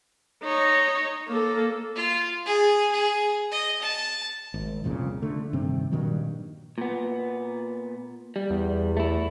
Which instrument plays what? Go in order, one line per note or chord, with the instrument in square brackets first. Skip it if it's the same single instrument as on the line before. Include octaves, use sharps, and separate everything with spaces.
[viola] D#4 C#5
A#3 A4
[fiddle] F4
G#4
G#4
D#5
A5
[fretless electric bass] G#1
C2 F2 A#2 C#3
D3 A3
G2 C3 D#3 C4
G2 A#2 D#3 F#3
[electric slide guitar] A#2 B3
G3
[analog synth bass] E2
[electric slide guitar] A3 E4